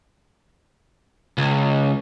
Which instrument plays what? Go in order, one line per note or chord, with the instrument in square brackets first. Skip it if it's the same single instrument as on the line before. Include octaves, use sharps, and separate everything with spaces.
[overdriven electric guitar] C#2